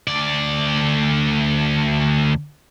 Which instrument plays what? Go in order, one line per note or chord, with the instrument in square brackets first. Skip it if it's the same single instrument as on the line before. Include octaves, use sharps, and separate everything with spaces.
[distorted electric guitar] D2 D5